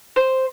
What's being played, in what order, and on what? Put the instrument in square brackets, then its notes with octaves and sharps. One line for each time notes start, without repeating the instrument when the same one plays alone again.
[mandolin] C5